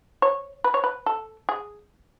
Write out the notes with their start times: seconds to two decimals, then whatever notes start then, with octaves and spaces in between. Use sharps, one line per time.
0.22 C#5
0.64 B4
0.74 C#5
0.84 B4
1.06 A4
1.49 G#4